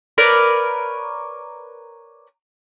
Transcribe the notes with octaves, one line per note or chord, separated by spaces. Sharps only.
A#4 B4 C#5 D5